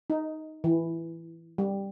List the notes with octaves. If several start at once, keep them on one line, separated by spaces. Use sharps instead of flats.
D#4
E3
G3